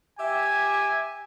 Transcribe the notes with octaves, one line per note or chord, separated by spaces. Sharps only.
G4 E5 G#5